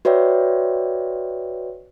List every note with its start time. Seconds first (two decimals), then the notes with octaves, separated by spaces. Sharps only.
0.05 F#4 B4 C#5 D5 E5 G5